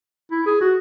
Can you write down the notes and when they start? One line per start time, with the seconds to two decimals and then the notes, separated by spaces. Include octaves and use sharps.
0.32 E4
0.46 G#4
0.61 F#4